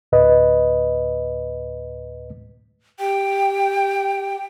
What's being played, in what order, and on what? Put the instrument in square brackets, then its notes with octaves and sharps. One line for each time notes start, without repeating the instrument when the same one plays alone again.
[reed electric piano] D2 A2 B4 D#5
[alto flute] G4 [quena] G5